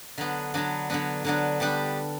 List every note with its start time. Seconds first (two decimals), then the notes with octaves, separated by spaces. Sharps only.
0.18 D3 F#3 B3 D4
0.54 D3 F#3 B3 D4
0.90 D3 F#3 B3 D4
1.25 D3 F#3 B3 D4
1.60 G3 B3 D4 G4